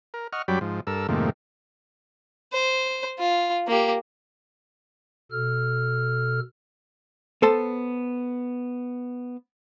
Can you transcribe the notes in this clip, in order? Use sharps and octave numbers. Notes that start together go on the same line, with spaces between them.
A#4
D#5 F#5 C#6 F6
F#2 F#3 G3 D5 G5 B5
G#2 F3
G2 A4 A#4 E6
F2 G#2 C3 D#3 A3 A#3
C5
F4
A#3 G4
B2 A4 F6
B3 A4 C5 A5